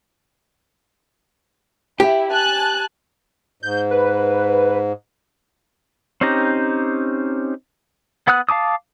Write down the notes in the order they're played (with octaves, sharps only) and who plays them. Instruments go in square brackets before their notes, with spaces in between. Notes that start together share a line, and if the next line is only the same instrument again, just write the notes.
[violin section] E4 [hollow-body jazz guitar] G4
[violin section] G#5 A5 F#6
[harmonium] G#2 [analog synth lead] G6
[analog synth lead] B4
[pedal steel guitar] C4 C#4 D#4 G4 A#5
B3 F#5 D#6 F#6
F5 A5 D6 D#6